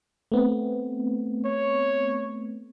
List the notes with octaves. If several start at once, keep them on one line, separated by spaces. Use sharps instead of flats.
A3 B3 C4
C#5